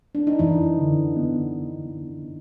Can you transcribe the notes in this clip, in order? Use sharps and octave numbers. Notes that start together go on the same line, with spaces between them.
D4
D#4
F#2 E3 E4
D3
B3